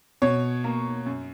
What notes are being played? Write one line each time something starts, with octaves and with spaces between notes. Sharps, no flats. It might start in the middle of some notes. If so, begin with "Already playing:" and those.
B2 C#5
A#3
F#2